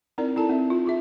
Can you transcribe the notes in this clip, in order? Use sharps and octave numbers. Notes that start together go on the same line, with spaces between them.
C4 D#4 E4 A#4 D5
E4 A4 A5 A#5
C4 E5
F4
F4 G#4 E5